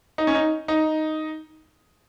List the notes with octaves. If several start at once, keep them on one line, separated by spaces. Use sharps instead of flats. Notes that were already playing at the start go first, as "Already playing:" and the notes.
D#4
C#4
D#4
D#4